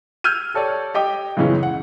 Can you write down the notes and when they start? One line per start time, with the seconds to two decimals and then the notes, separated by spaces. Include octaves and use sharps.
0.24 E6 F6 G6 G#6 D#7
0.54 G4 A4 C#5 D5
0.94 G4 D#5 G5 D6
1.37 C#2 F#2 B2 E3 G#3 C#4
1.63 F#5